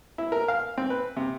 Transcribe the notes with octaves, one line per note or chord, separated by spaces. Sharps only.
E4
A#4
F5
C4
B4
C3